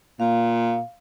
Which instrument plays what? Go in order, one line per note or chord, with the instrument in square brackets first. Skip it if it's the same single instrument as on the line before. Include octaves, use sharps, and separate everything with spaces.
[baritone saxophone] A#2 [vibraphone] F5